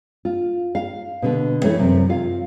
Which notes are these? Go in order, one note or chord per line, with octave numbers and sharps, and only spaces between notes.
F4
F5
B2 D3 B3
E3 A3 C#4 A4 C#5
F#2 C3
F4 F5